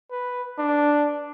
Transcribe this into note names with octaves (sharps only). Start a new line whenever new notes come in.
B4
D4